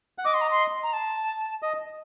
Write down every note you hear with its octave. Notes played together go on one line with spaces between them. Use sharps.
F#5
D#5 D6
C6
A#5
C6
A#5
A5
D#5